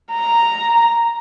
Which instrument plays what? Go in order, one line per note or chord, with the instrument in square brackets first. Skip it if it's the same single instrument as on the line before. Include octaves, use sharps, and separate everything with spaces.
[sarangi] A#5